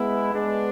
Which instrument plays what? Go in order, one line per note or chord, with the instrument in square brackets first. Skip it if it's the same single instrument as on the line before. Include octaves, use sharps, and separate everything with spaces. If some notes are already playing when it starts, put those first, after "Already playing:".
Already playing: [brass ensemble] G#3 B3 E4
G#3 B3 D4